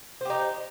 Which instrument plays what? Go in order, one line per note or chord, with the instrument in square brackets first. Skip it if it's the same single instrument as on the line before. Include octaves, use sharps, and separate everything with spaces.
[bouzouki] C5
G4
D#4